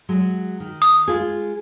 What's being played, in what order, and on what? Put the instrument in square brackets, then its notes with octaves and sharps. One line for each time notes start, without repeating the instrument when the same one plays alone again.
[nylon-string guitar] F#3 G#3
D#3
[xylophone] D#6
[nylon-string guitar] G#3 F4 G#4